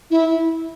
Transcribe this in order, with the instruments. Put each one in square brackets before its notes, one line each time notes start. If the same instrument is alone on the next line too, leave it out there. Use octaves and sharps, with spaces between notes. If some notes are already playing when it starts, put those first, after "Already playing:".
[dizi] E4